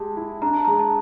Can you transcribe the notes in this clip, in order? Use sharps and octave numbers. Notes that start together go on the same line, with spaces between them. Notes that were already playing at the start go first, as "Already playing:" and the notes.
Already playing: G#3 G4 A5
E4
D4 A#5
A5
A#5
G#3
A5